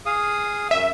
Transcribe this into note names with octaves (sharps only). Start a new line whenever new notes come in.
G#4 F5 D#6
F#2 E5